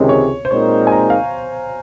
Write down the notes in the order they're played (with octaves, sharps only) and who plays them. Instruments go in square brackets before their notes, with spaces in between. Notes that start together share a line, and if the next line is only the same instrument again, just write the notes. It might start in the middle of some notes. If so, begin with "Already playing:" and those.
Already playing: [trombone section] C#2 C3 D#3 G#3 C#4
[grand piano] C#5
C5
[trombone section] A#2 G#3 C4 D#4 A#4 [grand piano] C#5
[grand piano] G#5
A#5
F5